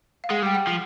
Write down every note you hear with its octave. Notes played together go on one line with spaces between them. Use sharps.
F5
G#3 F#5
G3 G5
F#5
F3